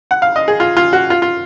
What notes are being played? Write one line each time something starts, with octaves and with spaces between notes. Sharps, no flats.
F#5
F5
D#5
G#4
F4
F4
F#4
F4
F4